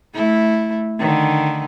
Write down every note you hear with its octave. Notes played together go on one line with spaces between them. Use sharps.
A3 E4
D3 D#3